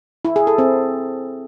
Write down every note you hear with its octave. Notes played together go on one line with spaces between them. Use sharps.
E4
G#4
A4
C4